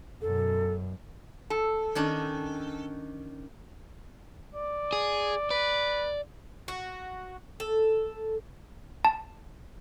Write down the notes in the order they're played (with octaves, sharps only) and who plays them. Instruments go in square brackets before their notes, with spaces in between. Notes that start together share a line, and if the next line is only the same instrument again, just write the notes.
[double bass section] F#2 B2 [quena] A4
[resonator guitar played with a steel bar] A4
[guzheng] D#3 C#4 D4
[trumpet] D5
[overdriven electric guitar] G#4
[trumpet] B4 [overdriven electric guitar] D5
[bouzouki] F#4
A4
[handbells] A5